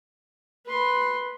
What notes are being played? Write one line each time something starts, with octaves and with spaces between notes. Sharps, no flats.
B4 C6